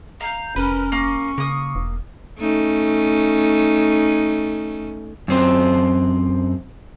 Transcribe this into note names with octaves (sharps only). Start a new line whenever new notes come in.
F5 A#5 G6
F1 C#4 A#4 B4
A#3 C#6
C#3 A#3 D#6
E1
A3 C#4 D#4
F#2 C4 C5